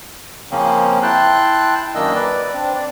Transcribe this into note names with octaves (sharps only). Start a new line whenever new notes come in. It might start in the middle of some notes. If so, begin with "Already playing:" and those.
C#3 F3 A#3 C4 C#4
E4 G5 A5 C6 F#6
F#2 D#3 A#3 D4 D#5 E6
B4 D5
C4 D4
D5